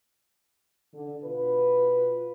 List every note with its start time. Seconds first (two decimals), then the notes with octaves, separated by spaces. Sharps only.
0.94 D3
1.24 B2 F4 B4